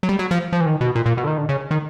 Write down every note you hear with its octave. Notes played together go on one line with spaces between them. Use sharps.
F#3
G3
F#3
F3
F3
E3
D#3
B2
A#2
A#2
B2
D3
D#3
D3
C#3
D#3